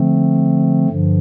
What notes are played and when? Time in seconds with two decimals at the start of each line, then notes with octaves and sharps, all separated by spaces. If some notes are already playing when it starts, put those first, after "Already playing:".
Already playing: D3 F3 A3 C4
0.89 G2 D3 F3